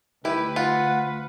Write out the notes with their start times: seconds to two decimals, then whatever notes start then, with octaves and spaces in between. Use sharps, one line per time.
0.25 D2 E4 G4 B4
0.56 F4 F#5